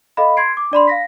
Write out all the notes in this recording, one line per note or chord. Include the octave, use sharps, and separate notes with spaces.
A4 D#5 F5 B5
C6 G#6 C7 D7
D6
D4 D5 B5 C6
F5 A#6 B6